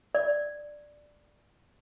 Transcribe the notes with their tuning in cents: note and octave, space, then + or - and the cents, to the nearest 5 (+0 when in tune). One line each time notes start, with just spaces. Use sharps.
D5 +5